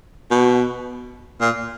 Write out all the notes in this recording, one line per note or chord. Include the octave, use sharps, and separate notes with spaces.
B2
A#2